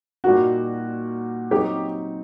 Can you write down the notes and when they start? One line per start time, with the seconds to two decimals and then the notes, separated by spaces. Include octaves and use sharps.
0.24 A#2 G3 A#3 D#4 F#4
1.51 F#3 C4 D#4 G4